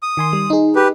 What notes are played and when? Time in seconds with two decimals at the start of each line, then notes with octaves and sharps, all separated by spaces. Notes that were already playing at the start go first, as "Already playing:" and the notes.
0.03 D#6
0.17 D#3 G#5 C6
0.33 G3
0.50 D#4 G#4
0.76 G4 B4